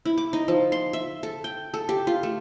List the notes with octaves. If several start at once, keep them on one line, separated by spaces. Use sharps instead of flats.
E4
D6
D#4
F3
C6
E5
A4
G5
A4
G4
F4
A3